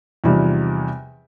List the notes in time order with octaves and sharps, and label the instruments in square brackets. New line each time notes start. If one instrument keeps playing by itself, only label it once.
[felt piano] E2 C3 F3 G3 D#4